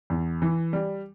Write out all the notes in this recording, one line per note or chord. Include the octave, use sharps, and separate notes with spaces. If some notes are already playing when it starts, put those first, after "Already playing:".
E2
E3
G3